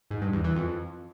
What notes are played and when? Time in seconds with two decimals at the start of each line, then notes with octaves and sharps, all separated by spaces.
0.11 G#2
0.22 G2
0.33 E2
0.44 E3
0.56 F2